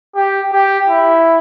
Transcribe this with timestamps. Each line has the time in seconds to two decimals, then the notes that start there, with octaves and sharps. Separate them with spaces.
0.15 G4
0.53 G4
0.89 E4